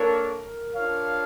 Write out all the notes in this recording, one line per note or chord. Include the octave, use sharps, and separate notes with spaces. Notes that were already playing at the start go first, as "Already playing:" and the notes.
Already playing: A#3 D4 A4 A#4 C#5
D4 F4 C#5 F5